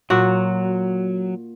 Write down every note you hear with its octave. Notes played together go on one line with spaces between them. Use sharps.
A#2 F#3 F#4